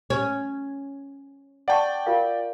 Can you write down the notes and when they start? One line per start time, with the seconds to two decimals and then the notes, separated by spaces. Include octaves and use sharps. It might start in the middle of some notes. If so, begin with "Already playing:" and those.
0.10 C#4
1.68 D5 F#5 G5 A5 C#6
2.06 F4 A#4 F5